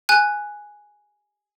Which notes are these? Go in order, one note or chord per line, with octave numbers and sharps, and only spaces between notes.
G#5 F#6